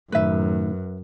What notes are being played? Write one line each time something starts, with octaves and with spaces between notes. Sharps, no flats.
F#2 A2 D#3 B4 E5